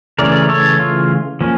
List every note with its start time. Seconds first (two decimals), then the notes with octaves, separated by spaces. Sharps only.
0.19 C#3 E3 A3 C#4 A#4 D5
0.49 A4 C#5
0.80 F4
1.41 F3 A#3 C#4